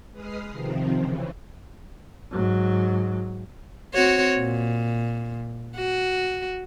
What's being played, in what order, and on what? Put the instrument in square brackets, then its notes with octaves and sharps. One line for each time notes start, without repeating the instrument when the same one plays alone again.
[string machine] G#3 B4 D#6 F6 C7
C3 D#3 F3 C4
C#3 E3
[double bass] G#2 F#3
[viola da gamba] C4 F#4 C#5
A#2
F#4